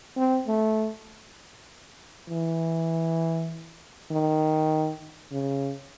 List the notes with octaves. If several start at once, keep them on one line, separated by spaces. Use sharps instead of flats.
C4
A3
E3
D#3
C#3